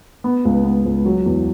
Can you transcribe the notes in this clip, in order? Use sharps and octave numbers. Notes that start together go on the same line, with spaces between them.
B3
C#2
B3
C#2
F#3
E2